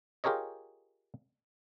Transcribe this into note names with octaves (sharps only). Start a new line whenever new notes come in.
F4 G4 G#4 A#4 C#5 D#5